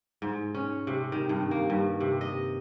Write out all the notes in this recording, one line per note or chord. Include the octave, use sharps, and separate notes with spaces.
G#2
C#4
C3
D#3
G2
A#3
G2
C3
D#5